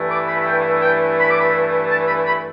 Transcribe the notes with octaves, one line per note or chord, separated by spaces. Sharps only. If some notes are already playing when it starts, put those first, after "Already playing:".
Already playing: G2 E3 A3
D6
B5
E5
G5
G5
B5
D6
B5
A5
B5
B5